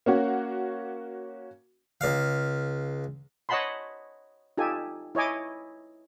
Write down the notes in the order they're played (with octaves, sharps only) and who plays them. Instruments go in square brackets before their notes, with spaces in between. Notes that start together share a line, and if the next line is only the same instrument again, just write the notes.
[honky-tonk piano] A#3 C#4 F#4
[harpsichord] C#2 F5
[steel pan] C#5 D#5 F#5 A5 B5 C6
D#4 F4 G4 A4 G#5
E4 C#5 D#5 G#5 D6